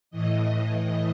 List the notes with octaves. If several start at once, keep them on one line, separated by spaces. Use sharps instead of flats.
A2 E3 D#5
D#5